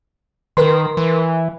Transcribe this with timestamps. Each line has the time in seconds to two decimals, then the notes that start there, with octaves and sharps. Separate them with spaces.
0.57 D#3 A#4 B4 C6
0.97 E3